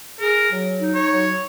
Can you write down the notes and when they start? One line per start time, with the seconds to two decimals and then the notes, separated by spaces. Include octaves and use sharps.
0.20 G#4 A#4
0.51 F#3
0.80 D#4
0.95 C#5
1.10 F#3